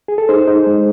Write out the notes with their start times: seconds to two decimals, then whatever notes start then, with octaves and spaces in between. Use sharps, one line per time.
0.08 G#4
0.18 A4
0.29 D#4 G#4 C5
0.48 D#4
0.67 G#3